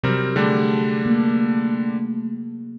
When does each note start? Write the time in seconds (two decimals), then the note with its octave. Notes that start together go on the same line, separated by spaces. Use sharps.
0.04 C3 F#3 G3 C4 A#4
0.36 D3 G3 A3 D4 G#4
1.06 A#3